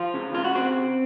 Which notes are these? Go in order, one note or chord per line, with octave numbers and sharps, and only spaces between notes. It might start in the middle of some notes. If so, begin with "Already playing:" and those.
Already playing: F3 F4
C#3
C#3 F4
F#4
C4 F#4